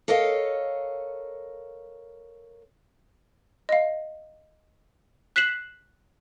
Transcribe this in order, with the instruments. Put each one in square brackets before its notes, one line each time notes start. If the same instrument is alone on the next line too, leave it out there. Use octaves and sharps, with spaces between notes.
[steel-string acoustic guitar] A4 A#4 C#5 D#5 F5
[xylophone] D#5 F5
F#6 B6 C7 E7 F#7